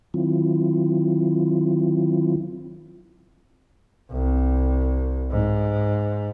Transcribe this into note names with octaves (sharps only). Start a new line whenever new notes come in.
D#3 F#3 C4 E4 F4
C2
G#2